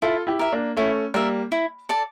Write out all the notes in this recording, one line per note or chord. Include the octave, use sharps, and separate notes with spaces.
E4 F4 A4
E4 G4
A#4 E5
A#3 D4
A3 C#4 E4
G3 A#3 A#4 E5
E4
A4 D5 A5